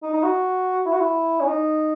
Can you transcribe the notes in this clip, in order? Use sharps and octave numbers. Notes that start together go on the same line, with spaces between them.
D#4
D#4
F#4
E4
F#4
E4
C#4
D#4